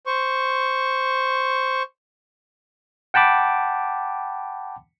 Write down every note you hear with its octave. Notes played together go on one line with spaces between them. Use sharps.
C5 C#6
F#5 G5 A5 B5 D6